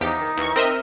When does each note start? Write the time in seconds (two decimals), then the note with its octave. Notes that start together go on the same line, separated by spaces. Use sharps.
0.01 E2 F3 D#4 G4 B6
0.20 D#3
0.37 D#2 E3 C#6
0.56 C4 A#4 D#5 E5